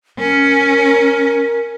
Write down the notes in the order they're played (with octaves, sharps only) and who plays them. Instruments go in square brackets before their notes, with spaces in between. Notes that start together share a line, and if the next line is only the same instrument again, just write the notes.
[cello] C#4 [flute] A#4